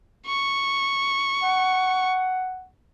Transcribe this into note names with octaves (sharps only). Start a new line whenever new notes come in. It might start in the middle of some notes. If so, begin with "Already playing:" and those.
C#6
F#5